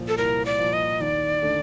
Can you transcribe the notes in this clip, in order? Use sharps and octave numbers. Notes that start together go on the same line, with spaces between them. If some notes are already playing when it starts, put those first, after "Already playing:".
Already playing: C2 A#2 F3
A4
C2 A#4
D5
A#2 F3
D#5
D#2 D5
D3 A3 D4